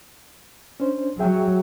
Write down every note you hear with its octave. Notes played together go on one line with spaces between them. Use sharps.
C#4 D4 C5
F#3 G#4 E5 G5